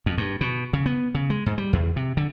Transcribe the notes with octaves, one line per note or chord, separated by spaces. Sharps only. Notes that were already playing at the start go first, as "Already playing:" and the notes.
F2
G2
B2
C#3
B3
C#3
G#3
G#2
G3
E2
C3
D3